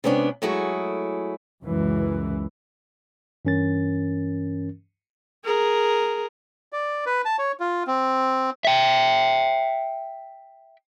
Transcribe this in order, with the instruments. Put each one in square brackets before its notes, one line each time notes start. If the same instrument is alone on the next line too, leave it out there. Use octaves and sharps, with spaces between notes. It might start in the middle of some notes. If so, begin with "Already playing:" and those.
[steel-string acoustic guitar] C3 G#3 B3 C#4 D4
F#3 G#3 A3 E4 F#4 G#4
[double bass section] C#2 F#2 E3
[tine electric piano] G2 E3 C#4 A#4 A6
[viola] G#4 A#4
[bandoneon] D5
B4
A5
C#5
F4
C4
[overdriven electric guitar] E5 G5